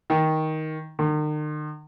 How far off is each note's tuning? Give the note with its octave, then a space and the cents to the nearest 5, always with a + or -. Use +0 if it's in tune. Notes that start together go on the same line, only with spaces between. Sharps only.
D#3 +10
D#3 -45